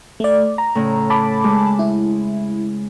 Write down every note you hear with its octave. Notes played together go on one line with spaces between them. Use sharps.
A3 D5
A#5
A2 C#3
A5 B5 D6
G#3
E4